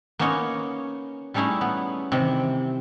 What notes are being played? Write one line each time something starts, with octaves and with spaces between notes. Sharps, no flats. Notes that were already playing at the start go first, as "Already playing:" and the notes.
A#3 B3 C#4 D#4 C#5
G3 A3 C#4 D#4 E4 G#4
B3
C3 D#3 E3 C4